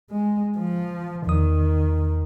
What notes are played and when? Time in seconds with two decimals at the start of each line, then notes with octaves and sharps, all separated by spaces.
0.11 G#3
0.58 F3
1.27 E2 D#3 D#6